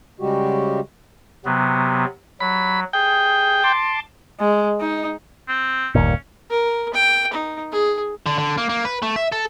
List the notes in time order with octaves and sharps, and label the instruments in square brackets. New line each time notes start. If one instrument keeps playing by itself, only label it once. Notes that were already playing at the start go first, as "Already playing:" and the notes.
[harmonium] C#3 G3 G#3 F#4 G4
[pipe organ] C3 F#3 B3
[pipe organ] F#3 [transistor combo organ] B5
[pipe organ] G#4 [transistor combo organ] G5
[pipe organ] A5 C6 D6
[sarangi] G#3
D#4
[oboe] C4
[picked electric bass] G1 D#2 A#2 [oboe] C#4
[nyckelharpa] A#4
G5
D#4
G#4
[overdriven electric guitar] D3
D3
A#3
A#3
B4
A3
E5
A4